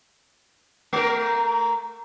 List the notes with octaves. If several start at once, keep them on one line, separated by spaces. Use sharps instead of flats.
A3 A#4